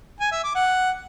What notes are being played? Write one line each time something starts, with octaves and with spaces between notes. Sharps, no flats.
G#5
E5
D6
F#5